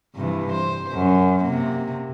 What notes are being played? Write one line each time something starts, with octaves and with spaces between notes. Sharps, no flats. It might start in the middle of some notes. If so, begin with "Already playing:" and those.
G2 C3 E3
C5
F#2
C3 A#3